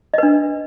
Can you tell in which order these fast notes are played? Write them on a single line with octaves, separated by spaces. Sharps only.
D#5 B4 D4